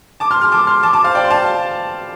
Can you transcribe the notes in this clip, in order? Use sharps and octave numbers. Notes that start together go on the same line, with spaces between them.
A5 D6
C6 F6
C6 F6
A5 D6
C6 F6
A5 D6
A5 D6
C5 F5
D5 G5
C6
F5 A5